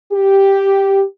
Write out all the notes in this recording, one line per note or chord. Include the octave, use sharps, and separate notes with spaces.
G4